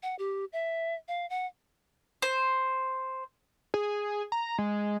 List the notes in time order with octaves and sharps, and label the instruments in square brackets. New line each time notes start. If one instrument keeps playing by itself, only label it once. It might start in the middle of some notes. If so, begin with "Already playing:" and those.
[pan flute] F#5
G4
E5
F5
F#5
[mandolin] C5
[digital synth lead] G#4
A#5
G#3